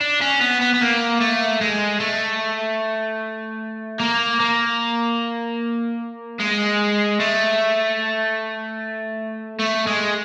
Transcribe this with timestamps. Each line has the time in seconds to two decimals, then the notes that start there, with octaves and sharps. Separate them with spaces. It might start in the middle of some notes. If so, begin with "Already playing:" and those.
0.01 D4
0.21 C#4
0.41 B3
0.61 B3
0.74 B3
0.81 A#3
1.20 A3
1.61 G#3
2.00 A3
4.00 A#3
4.40 A#3
6.39 G#3
7.20 A3
9.59 A3
9.87 G#3